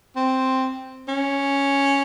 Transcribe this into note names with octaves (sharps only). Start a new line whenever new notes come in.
C4
C#4